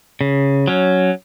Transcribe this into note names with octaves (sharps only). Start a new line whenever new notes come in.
C#3
F#3 C#4